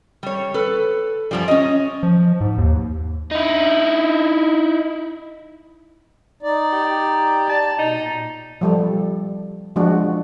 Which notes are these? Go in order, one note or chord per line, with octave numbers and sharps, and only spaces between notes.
G3 C#5
A4 B4
F#2 F3 G3
C#4 D#5
F3
G#2
D#2
D#4 E4
D#4 D5
G4
D5 A5
B2 D#4
A#2
F3 G3 A4
F3 G#3 D4 F#4